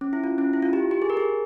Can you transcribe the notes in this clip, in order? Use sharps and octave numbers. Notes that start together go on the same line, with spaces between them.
C#4
E4
F4
C#4
E4
F4
G4
G4
G#4
A#4
G#4